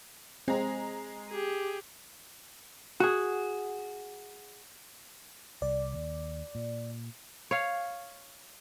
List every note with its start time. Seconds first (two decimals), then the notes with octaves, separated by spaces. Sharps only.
0.48 G#3 C4 A#5
1.30 G4 G#4
3.00 F#4 G#4
5.62 C2 D5
5.93 D#2
6.55 A#2
7.51 C#5 F5